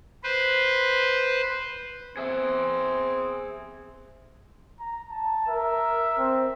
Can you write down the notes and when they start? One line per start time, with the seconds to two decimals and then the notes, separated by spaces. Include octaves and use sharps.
0.23 B4 C5
2.17 C4 G#4 E5
4.80 A#5
5.11 A5
5.48 A#4 E5
6.18 C4